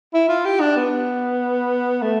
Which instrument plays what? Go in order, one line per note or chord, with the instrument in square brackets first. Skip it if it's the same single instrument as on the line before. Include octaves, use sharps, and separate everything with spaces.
[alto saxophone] E4
F4
G4
D4
B3
A3